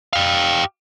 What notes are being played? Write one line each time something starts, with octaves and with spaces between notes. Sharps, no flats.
G4 F5